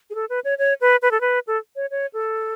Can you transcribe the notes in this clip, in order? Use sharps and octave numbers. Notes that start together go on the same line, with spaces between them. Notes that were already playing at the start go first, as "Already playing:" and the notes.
G#4
A4
B4
C#5
C#5
B4
B4
A4
B4
A4
C#5
C#5
A4